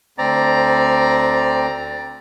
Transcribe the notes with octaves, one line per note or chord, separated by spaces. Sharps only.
D2 C4 D5 A#5